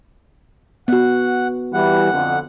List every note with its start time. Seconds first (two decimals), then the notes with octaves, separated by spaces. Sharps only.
0.88 B3 F#4 F#5
1.73 E3 G3 F#5
2.12 F2 D3